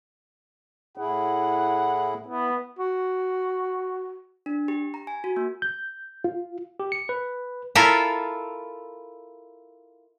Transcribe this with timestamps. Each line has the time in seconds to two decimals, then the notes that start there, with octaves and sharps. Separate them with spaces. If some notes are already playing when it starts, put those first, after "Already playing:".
0.97 A2 E4 G#4 F#5
2.26 B3 E4
2.79 F#4
4.46 D4
4.68 G4
4.94 A#5
5.07 G#5
5.24 F#4
5.37 A#3
5.62 G6
6.24 F4
6.80 G4
6.92 C#7
7.09 B4
7.75 E4 F4 A4 A#4 E5